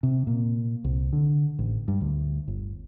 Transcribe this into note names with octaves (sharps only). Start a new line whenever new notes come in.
C3
A#2
C2
D3
A1
G2
D2
G1